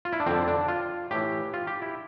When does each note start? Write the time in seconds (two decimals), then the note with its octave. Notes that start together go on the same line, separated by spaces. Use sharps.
0.05 F4
0.13 E4
0.20 D4
0.26 F2 D3 C4
0.48 D4
0.68 F4
1.11 A2 E3 G4
1.54 F4
1.67 G4
1.82 E4